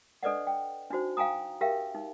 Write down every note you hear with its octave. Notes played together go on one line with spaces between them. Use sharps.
D4 A4 B4 D5 D#5 F#5
G5
D4 D#4 F#4 C5
F5 G5 G#5 A#5 D#6
G4 A#4 E5 F5 G5
D#4